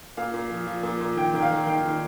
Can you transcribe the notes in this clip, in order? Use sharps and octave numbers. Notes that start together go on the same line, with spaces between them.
A#2 F5
A#2
F3
F3
A#2
A#2
D#3 G5
D#3 G5
F5
D#3
D#3 G5
D#3